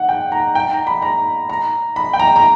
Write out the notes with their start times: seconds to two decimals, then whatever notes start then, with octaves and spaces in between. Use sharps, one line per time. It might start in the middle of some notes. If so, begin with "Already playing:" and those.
Already playing: F#5
0.09 G5
0.32 A#5
0.55 G5
0.71 A#5
0.87 B5
1.02 A#5
1.50 A#5
1.96 B5
2.13 G5
2.20 A#5
2.36 A#5